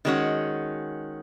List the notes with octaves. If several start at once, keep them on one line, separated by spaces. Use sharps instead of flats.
D#3 G#3 C#4 F#4